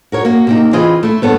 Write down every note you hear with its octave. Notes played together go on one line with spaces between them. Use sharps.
F#4 A#4 C#5
A#3 F#4
C3 A#3 D#4
E3 C4 F4 G#4 B4 D#5
A3 E4
G2 B3 A4 C#5